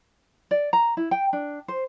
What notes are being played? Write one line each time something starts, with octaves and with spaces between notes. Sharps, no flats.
D5
A#5
E4
G5
D4
C5